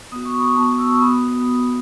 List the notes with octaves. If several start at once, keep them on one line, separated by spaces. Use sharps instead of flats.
B3 F#4 D#6
C#6
B5 D#6
B3 F#4 A5 C#6
C#6 E6
B3 F#4 B5 D#6